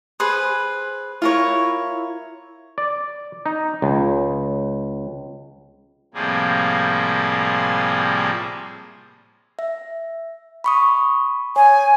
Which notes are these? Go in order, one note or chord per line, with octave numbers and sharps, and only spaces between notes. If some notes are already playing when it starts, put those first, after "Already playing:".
G#4 B4 C5
E4 F4 A#4 C#5
D5
D#4
C#2
A2 C3 F3 G3 A#3 G#4
E5
B5 C#6 D#6
C#5 G#5